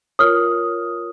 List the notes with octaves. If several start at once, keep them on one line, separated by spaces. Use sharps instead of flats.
F4 A#4 C#5 D#6 F6